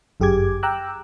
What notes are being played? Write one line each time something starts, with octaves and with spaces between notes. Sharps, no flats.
G1 F#2 G4 G#4 D6 G#6
G5 A#5 D6 E6 F#6